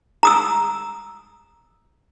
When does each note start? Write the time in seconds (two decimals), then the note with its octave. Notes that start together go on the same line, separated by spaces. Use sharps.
0.23 A#5 D#6 E6